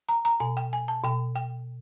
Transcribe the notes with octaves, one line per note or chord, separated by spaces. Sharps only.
A#5
A#5
B2 G#5
G5
G#5
A5
B2 G5
G5